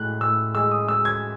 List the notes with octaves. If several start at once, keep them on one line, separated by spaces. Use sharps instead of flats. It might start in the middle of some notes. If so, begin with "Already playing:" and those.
Already playing: A2 G#3 F#6
A2 E6
G#3 E6
D#6
G#3 E6
G#6